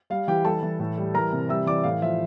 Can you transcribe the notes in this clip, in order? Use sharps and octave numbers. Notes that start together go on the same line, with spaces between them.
G3 F5
E3 G4 G5
G3 A4 A5
E3
A2
G3
E3 A#4 A#5
C3
G3 E5 E6
E3 D5 D6
A2 F5
F3 E5